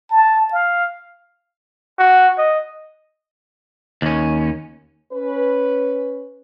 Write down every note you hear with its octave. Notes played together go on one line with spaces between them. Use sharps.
A5
F5
F#4
D#5
D#2 C#4
C#4 B4